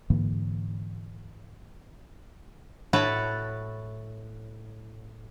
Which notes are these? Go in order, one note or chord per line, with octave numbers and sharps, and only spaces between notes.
G#2 D3 E3 A#3
A2 E4 F#4 B4 C#5 A5